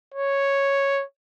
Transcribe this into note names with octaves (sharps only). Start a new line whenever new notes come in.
C#5